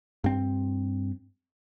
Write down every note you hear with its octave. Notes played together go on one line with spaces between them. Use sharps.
G2 C4